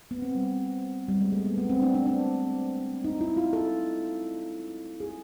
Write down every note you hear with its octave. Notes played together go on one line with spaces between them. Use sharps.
B3
C4
G3
G3
G#3
A3
B3
B3
C4
D4
D4
D4
D#4
E4
F4
A4
G#4